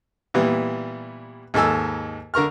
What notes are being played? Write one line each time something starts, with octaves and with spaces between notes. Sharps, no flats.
A#2 E3 G3 B3
D#2 G#2 A4 G#5 E6
D3 A#4 C#6 F6